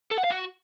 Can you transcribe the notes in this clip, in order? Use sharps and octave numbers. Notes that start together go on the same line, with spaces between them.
A4
F#5
F5
F#4